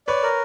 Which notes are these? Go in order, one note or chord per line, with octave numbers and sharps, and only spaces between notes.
B4 C#5 D5
A#4